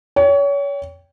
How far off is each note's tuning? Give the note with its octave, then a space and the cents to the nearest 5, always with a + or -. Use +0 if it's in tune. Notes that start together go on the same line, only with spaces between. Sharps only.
C#5 +30 G5 +0